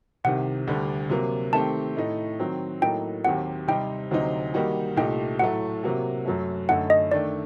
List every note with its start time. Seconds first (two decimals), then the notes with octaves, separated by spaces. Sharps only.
0.24 C2 C3 D#3 F#5
0.67 D2 D3 G3 D4
1.10 C3 F#3 A#3
1.53 D#3 A3 C4 G4 A5
1.97 A2 A3 D#4
2.39 D#3 F#3 C4
2.81 A2 F#3 A#3 D#4 A4 G5
3.25 D#2 D#3 F#3 C4 G4 F#5
3.68 C3 G3 C4 D#4 G5
4.11 D2 C3 F#3 C4 D#4
4.54 D#3 G3 A#3 D#4 F#4
4.97 C2 A#2 A3 D#4 G4 G5
5.39 A2 F#3 A3 F#5
5.83 C3 F#3 A#3 F#4
6.25 F#2 F#3 A3
6.69 F#2 D3 A3 D#4 A4 F#5
6.90 D#5
7.11 D#3 A3 D4 D5